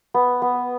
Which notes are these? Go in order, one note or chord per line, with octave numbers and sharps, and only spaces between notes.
B3
B3